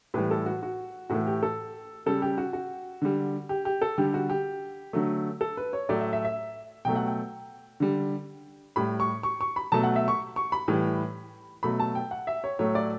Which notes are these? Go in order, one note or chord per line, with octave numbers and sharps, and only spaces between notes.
A2 E3 G3 B4
A4
F#4
F#4
A2 E3 A3 F#4
G4
A4
C#3 G3 A4
G4
F#4
F#4
D3 G3
G4
G4
A4
D3 G3 G4
F#4
G4
D3 F#3 A3
A4
B4
C#5
A2 F#3 A3 D5
E5
E5
E5
B2 F#3 A3 G5
F#5
G5
D3 G3
A2 G3 B5
C#6
C#6
C#6
B5
B2 F#3 A3 A5
F#5
E5
C#6
C#6
B5
A2 E3 G3
B2 F#3 A3 B5
A5
G5
F#5
E5
C#5
A2 F#3 A3 C#5
D5